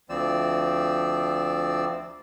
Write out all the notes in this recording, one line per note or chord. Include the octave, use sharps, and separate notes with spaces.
D2 F3 C4 D5 E6